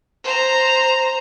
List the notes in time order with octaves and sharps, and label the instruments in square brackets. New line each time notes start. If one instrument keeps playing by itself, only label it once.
[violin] C5 A#5